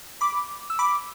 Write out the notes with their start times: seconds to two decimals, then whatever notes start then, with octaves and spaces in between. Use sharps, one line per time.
0.21 B5 D6
0.70 E6
0.79 B5 D6